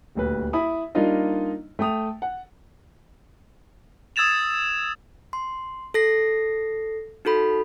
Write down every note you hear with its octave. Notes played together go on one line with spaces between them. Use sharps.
D#1 D2 B4
E4 B5 D#6
G3 A#3 D4 D#4 F4 D#5
A3 G5 D#6 F7
F#5
D#6 E6 G#6 A6 E7 F7
C6
A4 A#6 C7
D#4 F#4 A4 B5